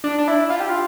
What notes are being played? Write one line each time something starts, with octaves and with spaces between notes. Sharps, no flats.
D4
D4
E4
F4
G4
F4